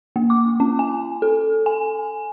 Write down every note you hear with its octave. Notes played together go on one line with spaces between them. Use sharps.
A#3
D6
C#4
G#5
A4
G#5